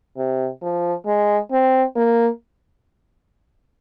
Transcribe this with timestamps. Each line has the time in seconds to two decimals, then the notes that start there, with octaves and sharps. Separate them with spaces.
0.17 C3
0.62 F3
1.06 G#3
1.52 C4
1.96 A#3